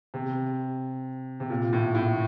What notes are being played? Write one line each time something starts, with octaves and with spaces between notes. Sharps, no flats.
C3
C3
A#2
A2
A2